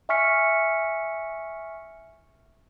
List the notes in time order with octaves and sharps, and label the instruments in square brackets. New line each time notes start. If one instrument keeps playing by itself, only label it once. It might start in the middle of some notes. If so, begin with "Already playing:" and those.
[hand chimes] E5 G#5 C#6 F6 B6 C#7